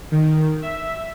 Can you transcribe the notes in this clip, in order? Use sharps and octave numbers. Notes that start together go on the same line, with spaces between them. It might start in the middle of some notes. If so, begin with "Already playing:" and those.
D#3
E5